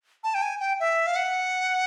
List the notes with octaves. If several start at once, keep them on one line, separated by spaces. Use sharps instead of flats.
A5
G5
G#5
G5
E5
F5
F#5